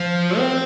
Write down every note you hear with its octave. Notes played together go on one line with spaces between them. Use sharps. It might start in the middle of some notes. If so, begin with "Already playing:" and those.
Already playing: F3
C4